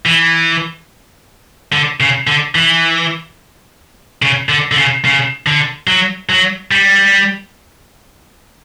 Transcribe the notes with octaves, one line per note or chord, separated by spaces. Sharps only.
E3
D3
C#3
D3
E3
C#3
D3
D3
C#3
C#3
D3
F#3
F#3
G3